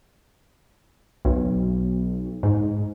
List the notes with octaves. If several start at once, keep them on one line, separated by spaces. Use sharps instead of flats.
B1
G#2